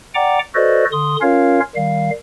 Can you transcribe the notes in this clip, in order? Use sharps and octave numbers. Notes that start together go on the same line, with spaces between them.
D5 F#5 G5 A#5 D6
F#4 A4 B4 C5 D5 D#5
D3 C6 D#6
C#4 F4 A#4 C#5 F5
D#3 G3 F5